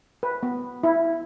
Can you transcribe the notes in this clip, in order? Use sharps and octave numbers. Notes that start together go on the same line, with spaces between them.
B4
B3
E4